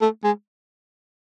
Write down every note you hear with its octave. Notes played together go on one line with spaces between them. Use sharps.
A3
G#3